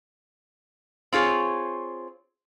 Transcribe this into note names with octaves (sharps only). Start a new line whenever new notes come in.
C4 F4 G#4 C#5